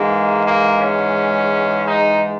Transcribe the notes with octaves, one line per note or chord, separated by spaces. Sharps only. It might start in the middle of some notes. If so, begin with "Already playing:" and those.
Already playing: G#2 E3 G#3 A#3
A#3
C#4
D#4